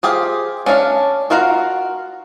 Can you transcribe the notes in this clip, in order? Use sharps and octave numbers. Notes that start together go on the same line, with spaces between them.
F4 G4 G#4 C5 F5
C#4 D4 C#5 F5
F4 F#4 A#4 F5 A#5